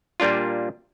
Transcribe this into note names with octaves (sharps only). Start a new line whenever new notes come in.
A#2 G3 A#3 D4 F4